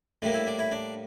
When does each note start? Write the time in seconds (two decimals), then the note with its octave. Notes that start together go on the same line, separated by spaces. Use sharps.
0.22 A2 G3 A#3 D4
0.34 E4
0.47 D4
0.59 E4
0.71 D4